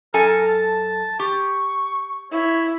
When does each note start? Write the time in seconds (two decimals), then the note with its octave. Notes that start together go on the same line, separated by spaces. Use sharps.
0.14 F#2 A4 A#4 G#5
0.48 A5
1.19 G4 C#6
2.32 E4 C#5